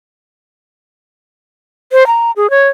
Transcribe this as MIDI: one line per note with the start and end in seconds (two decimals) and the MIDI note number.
1.92 2.06 72
2.07 2.31 82
2.36 2.50 68
2.50 2.68 73